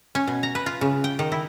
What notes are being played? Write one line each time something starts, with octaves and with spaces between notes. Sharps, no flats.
C#4
B2
A#5
B4
F4
C#3
G5
D#3
E4